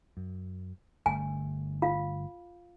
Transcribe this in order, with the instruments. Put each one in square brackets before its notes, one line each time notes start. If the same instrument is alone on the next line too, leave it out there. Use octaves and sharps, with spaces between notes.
[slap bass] F#2
[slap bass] G1 D3 A3 [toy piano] G#5
[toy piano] F4 F5